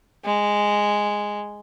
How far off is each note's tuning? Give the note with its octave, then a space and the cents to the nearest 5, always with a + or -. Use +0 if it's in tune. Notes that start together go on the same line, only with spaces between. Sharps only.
G#3 -5